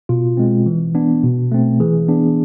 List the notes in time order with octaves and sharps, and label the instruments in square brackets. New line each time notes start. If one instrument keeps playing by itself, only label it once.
[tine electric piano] B2 F4
G#3 C4
E3
B3 D4
B2
A3 C4
E3 G#4
B3 D4